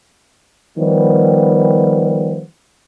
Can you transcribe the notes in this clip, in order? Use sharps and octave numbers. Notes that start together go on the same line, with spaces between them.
D#3 F3 G3 B3